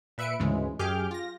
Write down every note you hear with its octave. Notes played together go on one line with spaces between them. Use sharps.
A#2 B4 E5 C#7 D7
D2 G#2 C#3 E3 G#3
F#2 G4 G#4 D6 F6 G6
F4 A#6